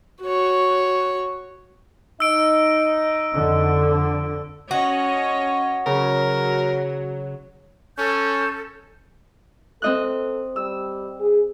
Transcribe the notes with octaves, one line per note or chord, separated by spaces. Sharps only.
F#4 C#5
D#4 D#5 E6 D7
F2 D3
C#4 F#4 C#5 D#5
C#3 F#3 A#4
C#4 A4 G6
C4 A4 D#5 F#6
G3 E6
G#4